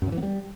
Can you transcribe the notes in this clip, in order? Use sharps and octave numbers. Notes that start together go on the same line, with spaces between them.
F#2
C#3
E3
B3
G3